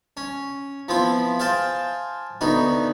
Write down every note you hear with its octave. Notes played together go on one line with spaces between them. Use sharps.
C#4
F3 B3 C4 E4
G#4 C5 F5 G5 A5
D2 B3 D#4 F#4